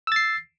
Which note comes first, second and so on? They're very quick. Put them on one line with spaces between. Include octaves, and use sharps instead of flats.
E6 A6 C7